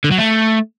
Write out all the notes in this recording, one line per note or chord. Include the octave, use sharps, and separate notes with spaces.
D3
F#3
A3